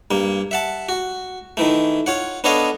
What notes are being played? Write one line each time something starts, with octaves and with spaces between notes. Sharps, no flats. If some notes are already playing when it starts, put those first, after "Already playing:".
G2 A#3
E5 F#5 A5
F#4
D#3 E3 A3
F4 C#5 F#5
B3 D4 A4 C#5 D#5 F5